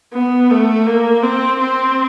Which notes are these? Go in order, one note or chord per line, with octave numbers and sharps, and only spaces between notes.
B3
A3
A#3
C4
C4